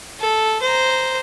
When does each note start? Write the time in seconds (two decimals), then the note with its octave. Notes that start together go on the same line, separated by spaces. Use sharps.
0.19 A4
0.62 C5 A#5